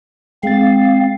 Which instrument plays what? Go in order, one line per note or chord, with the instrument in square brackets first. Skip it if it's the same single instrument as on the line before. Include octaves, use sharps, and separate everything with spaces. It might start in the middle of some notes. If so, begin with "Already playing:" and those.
[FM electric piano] G#3 A6 [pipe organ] C4 F5